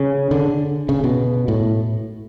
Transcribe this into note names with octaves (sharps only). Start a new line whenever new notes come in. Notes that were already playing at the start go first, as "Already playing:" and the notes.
Already playing: C#3
D3
C#3
B2
A2